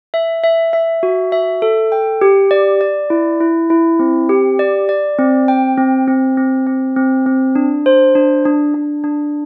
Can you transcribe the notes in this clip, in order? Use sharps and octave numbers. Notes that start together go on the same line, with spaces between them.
E5
E5
E5
F#4
E5
A4
G5
G4
D5
D5
E4
E4
E4
C4
G4
D5
D5
C4
G5
C4
C4
C4
C4
C4
C4
D4
C5
D4
D4
D4
D4